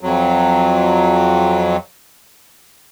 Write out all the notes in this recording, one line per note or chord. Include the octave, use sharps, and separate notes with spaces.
F2 F#3